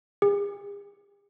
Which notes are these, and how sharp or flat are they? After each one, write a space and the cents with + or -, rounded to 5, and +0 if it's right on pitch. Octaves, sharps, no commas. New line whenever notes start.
G#4 -45